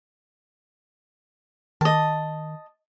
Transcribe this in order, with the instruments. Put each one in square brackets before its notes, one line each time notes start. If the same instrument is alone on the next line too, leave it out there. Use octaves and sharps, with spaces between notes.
[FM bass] D#3 [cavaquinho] D#5 A5